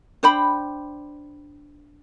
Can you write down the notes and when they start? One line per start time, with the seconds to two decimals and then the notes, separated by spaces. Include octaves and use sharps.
0.23 D4 C5 G5 B5